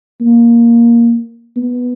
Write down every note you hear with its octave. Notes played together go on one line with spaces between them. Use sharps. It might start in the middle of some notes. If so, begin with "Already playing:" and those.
A#3
B3